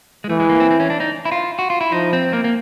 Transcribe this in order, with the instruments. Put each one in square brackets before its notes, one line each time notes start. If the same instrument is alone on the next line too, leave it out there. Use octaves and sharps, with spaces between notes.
[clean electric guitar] G#3
[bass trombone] E3 [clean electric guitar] A3
[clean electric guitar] G#3
A#3
C4
C4
C#4
D4
D#4
E4
F4
F#4
F4
E4
[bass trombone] F3 [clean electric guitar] D#4
[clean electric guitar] C4
A#3
A#3